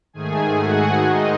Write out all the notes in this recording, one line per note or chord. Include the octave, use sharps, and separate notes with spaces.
G#2 D#3 A3 G#4 G#5
F#4 F#5
G#2 D#3 G#3 D#4 D#5